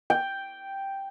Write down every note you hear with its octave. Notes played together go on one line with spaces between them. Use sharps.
G5